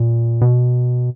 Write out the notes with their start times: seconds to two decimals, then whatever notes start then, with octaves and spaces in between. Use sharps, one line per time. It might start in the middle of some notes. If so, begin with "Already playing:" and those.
Already playing: A#2
0.41 B2